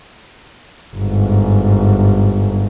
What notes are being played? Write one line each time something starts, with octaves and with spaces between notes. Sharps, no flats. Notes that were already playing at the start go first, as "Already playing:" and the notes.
G1 G#2